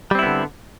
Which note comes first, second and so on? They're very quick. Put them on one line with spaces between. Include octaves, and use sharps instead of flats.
G3 C4 E4 B3 D3